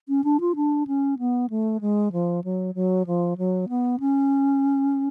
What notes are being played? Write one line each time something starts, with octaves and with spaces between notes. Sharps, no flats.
C#4
D4
F4
D4
C#4
B3
A3
G#3
F3
F#3
F#3
F3
F#3
B3
C#4